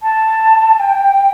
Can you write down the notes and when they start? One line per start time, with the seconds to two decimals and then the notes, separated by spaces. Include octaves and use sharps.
0.02 A5
0.79 G5